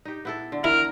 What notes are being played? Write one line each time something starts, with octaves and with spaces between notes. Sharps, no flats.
D#4 G4
B3 E4 A4
D3
E4 A#4